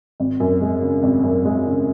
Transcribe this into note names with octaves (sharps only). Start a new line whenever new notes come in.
G#1
F#2
G#3
C#3
G#1
F#2
G#3
C#3